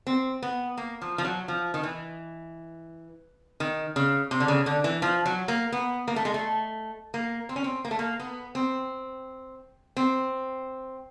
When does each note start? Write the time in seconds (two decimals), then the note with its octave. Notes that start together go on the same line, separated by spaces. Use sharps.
0.07 C4
0.42 B3
0.77 A#3
1.02 F3
1.18 F3
1.25 F#3
1.48 F3
1.74 D#3
1.83 E3
3.60 D#3
3.96 C#3
4.31 C3
4.40 D3
4.48 C#3
4.66 D3
4.84 E3
5.02 F3
5.26 F#3
5.48 A#3
5.72 B3
6.08 A#3
6.16 A3
6.25 G#3
6.34 A3
7.14 A#3
7.49 C4
7.56 C#4
7.64 C4
7.85 A#3
7.91 A3
7.99 A#3
8.20 B3
8.55 C4
9.97 C4